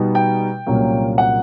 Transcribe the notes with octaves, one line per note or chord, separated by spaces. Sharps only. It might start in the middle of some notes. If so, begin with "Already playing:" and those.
Already playing: B2 G3 B3 D#4
G5
C2 A#2 F#3 A#3 C#4
F#5